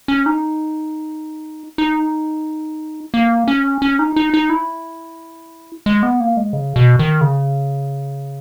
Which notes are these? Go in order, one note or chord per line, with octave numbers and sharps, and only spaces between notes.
C#4
D#4
D#4
A#3
C#4
C#4
D#4
D#4
D#4
E4
G#3
B3
A#3
G#3
C#3
B2
D#3
C#3